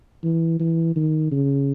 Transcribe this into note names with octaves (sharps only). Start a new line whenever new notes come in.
E3
E3
D#3
C#3